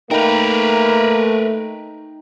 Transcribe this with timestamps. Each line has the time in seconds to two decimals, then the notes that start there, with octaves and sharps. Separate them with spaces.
0.11 A3 A#3 D#4 A#4 B4 G5 A#5